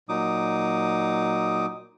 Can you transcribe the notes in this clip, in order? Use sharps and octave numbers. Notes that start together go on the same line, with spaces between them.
A#2 F#3 D#4 D6 D#6